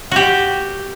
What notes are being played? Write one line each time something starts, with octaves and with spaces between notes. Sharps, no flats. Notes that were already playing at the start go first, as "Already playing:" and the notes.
F#4 G4